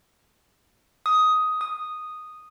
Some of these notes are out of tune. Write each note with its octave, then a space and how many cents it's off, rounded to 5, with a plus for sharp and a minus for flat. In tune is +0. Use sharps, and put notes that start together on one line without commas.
D#6 +10
D#6 -5